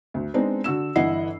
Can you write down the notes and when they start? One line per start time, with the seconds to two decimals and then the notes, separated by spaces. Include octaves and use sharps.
0.14 D2
0.34 G#3 B3 C4 D4 D#4
0.64 D3 F#4 E6 E7
0.96 G1 E3 E4 D#5 F#5 C7